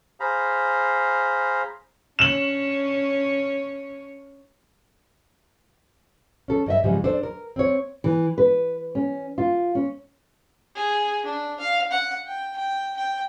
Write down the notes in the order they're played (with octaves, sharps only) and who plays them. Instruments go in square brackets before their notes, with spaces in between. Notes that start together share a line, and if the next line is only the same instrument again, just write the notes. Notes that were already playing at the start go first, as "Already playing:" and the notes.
[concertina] G#4 C5 F5 A#5 B5
[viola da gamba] C#4 D4 C#5 [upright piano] E7 F#7
[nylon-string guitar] C#4 A4
G2 D#5 E5
G#2 C#3 F3 G3 G#3
D4 A4 C5
A#4
C4 C#5
E3
B4
C#4
F4
C#4
[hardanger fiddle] G#4
D4
F5
F#5
G5
G5
G5